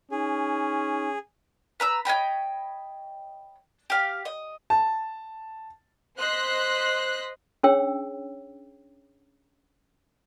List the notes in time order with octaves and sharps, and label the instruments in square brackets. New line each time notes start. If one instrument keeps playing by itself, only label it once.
[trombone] C#4 [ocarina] D#4 [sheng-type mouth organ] G#4
[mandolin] B4 A#5 E6
C#5 D#5 G5 B5
G4 F5
D#5
[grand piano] A5
[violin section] C5 D#5 C6 F#6 B6
[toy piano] C#4 D4 G#4 C#5 G5 E6